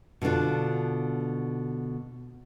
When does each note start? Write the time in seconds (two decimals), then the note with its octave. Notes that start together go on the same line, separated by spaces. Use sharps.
0.21 B2 D3 B3 D4 F4